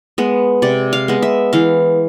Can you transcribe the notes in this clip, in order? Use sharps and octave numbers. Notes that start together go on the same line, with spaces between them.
G#3 B3
C3 D5
F5
G#3 B3
E5
E3 F5